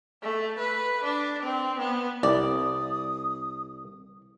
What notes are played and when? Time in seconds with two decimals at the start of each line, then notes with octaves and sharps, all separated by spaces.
0.23 A3
0.59 B4
1.04 D4
1.43 C4
1.79 B3
2.23 C2 D5 D#6